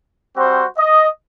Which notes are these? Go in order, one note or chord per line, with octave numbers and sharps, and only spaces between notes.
G3 C4 F#4 C5
D#5